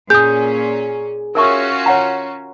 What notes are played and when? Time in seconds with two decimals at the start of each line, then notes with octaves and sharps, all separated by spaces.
0.10 A#2 C#4 G#4 D#6 G6
1.35 C#4 F4 F#4 A#4 E5 C#6
1.86 C#5 F#5 A#5